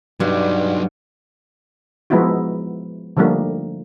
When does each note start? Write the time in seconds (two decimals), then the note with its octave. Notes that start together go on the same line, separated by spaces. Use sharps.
0.20 G2 F#3 D#4
2.10 F3 G#3 B3 D#4 E4 F#4
3.17 D3 F3 G3 A3 A#3 D#4